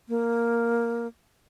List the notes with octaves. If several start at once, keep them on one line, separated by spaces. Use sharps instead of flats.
A#3